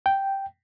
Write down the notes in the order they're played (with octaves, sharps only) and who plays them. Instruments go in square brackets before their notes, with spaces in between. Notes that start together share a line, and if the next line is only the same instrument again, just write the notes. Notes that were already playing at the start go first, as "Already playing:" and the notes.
[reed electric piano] G5